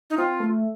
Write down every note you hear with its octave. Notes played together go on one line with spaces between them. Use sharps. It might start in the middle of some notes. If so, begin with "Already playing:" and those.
D#4
C4 F4
A3